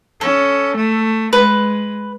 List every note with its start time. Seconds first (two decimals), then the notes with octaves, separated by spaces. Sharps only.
0.21 C#4 A4
0.77 A3
1.33 G#3 B4